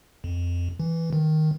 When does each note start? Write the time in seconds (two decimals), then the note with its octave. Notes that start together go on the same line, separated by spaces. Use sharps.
0.24 F2
0.80 E3
1.13 D#3